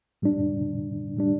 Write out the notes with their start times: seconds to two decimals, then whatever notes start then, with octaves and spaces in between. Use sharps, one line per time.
0.22 A2 G3 D4
1.17 A2 G3 D4